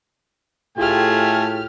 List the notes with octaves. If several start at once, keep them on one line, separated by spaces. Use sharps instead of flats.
A2 A3 F4 G4 G#4 G5 G#5 F6